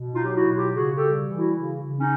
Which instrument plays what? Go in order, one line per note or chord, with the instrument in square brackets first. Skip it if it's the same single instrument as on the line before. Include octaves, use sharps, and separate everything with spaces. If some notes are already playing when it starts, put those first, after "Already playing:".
Already playing: [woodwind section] B2
D#4 F4
F#3 G4
E4 F#4
B2
F4 G4
C#3 F#4 G#4
G4 A4
G3
E3
E4 F#4
C#3
C#3
C#4 D#4